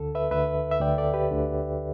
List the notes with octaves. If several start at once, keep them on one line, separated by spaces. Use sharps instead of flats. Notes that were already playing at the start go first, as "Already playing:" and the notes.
Already playing: D2 D3 A4
B4 E5
D2 D3 B4 E5
E5
D2 D3 D5 G5
A4 D5
G4 B4
D2 D3